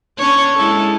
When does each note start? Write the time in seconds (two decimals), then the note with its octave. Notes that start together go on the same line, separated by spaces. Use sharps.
0.18 C#4 D4 C#5
0.56 G#3 E4 A4